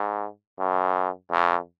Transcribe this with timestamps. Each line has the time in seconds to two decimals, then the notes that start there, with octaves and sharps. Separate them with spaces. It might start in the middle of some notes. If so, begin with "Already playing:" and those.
Already playing: G#2
0.59 F#2
1.31 F2